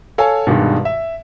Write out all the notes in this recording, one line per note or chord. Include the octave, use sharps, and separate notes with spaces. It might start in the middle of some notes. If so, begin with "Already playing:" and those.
A4 C#5 F5 G#5
G2 B2 D#3 G3 G#3
E5